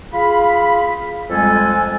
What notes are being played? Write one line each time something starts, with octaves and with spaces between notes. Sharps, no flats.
F4 G#4 F5 B5
F2 G3 G#3 A4 G#5